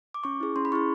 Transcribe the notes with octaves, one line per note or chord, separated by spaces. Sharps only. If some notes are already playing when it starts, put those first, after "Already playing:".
D6
C#4 C#6
E4 G#4
C#4 C6
B5
E4 G#4 C#6